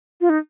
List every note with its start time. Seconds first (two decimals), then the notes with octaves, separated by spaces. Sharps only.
0.21 F4
0.29 D#4